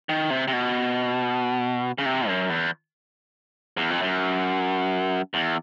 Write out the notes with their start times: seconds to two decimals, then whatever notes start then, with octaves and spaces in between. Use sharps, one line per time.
0.09 D#3
0.30 C3
0.48 C3
0.53 B2
1.98 C#3
2.06 C3
2.28 F#2
2.50 E2
3.77 E2
3.90 F2
4.02 F#2
5.34 E2